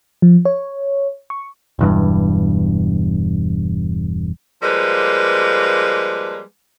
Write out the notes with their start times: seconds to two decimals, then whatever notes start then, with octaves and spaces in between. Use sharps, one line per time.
0.22 F3
0.45 C#5
1.30 C#6
1.79 E1 E2 G2
4.62 F3 G3 G#3 A#3 B4